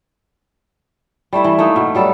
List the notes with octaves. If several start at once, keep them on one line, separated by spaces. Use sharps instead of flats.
G3 A3 E4 E5
E3
A3 A#3 D#4
B2
F#3 G3 A4